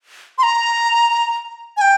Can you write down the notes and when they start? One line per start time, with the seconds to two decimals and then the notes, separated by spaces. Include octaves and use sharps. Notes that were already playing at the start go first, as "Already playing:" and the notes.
0.38 C6
0.43 A#5
1.77 G#5
1.81 G5